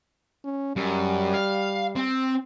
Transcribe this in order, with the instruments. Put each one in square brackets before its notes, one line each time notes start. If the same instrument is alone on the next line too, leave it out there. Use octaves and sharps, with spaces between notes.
[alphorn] C#4
[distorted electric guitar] F#2 [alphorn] G3
[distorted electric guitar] F5
C4